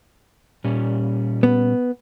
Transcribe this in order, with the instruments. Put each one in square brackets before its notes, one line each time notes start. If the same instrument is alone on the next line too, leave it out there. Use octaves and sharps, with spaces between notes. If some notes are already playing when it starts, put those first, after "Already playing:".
[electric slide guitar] A#2 G3 C#4
[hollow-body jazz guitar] B3